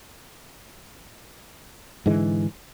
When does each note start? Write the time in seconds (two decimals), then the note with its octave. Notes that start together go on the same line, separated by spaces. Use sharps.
2.06 G#2 D3 E3 G#3